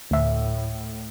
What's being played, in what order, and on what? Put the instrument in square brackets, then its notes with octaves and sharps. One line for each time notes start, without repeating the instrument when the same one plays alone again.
[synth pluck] D2 E5 [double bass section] A2